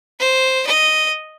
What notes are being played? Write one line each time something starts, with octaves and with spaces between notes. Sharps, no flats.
C5
D#5